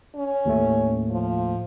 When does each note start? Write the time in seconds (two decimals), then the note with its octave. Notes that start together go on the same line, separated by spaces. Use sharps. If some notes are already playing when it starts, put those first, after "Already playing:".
0.16 C#4
0.45 D#2 A2 A3
1.10 F3